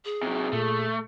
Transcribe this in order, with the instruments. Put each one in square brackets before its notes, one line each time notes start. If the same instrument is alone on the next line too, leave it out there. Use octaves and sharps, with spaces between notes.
[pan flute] G#4
[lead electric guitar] C3 F#3
[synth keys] A#2 [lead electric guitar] A3